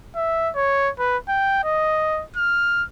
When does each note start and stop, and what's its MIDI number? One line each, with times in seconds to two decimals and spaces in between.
0.16 0.50 76
0.55 0.90 73
0.99 1.17 71
1.29 1.62 79
1.64 2.23 75
2.36 2.84 89